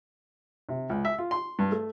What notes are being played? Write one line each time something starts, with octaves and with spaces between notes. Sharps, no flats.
C3
C#2
E5
F4
C6
G2
A3